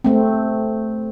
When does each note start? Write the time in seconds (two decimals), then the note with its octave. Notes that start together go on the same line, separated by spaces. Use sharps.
0.04 A3 C4